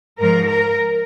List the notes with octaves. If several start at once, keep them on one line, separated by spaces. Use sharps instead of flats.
G#2 F3 A#4
A#4